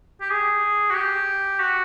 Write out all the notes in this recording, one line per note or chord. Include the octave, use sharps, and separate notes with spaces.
G4
G#4
F#4
G4
F#4